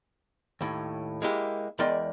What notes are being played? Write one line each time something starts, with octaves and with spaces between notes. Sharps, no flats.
D#2 A2
G#3 A#3 E4 G4
E2 G#3 A#4 D5 D#5 G5